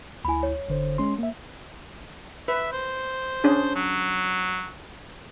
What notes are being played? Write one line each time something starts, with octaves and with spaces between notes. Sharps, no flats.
D2 E4 G#5 B5
C#5
G1 D3 C5
G#3 C#4 C6
A#3 E5
B4 E5
C5
C#4 D4 G#4
F#3